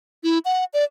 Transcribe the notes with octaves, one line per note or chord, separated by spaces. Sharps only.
E4
F#5
D5